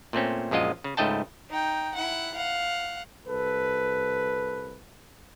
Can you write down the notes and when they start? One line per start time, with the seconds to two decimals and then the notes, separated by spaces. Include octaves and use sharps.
0.13 A#2 A3 C4 C#4
0.51 A#1 F#2 G#3 F4 D#5
0.84 C#3
0.97 C#2 G#2 A3 D#5 G5 A5
1.49 D#4 G5
1.94 E4 F#5
2.34 F5 F#5
3.27 C2 A4 B4